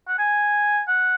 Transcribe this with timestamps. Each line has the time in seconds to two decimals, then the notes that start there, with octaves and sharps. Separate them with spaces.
0.08 F#5
0.19 G#5
0.88 F#5